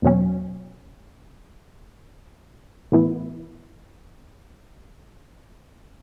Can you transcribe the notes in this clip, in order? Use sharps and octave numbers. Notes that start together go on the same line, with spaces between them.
E2 B2 F#3 C#4
A2 E3 B3 E4